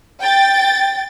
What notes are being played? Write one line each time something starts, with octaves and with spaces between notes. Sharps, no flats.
G5 A6